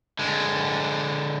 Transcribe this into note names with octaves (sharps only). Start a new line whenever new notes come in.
D3 G#3